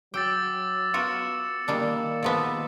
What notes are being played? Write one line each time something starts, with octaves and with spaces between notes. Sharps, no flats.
F#3 G5 D6 E6 A6
B3 F4 F#4 A#4 C#7 E7
D#3 G3 A#3 D4
D#3 F3 B3